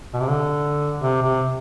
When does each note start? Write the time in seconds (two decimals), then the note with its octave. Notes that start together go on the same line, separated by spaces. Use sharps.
0.13 B2
0.21 C3
0.29 D3
0.99 C3
1.23 C3